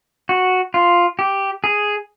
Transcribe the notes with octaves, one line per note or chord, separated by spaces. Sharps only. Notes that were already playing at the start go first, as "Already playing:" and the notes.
F#4
F4
G4
G#4